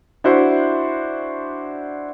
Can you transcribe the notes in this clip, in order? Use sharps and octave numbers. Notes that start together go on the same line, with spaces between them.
D4 E4 F#4 C5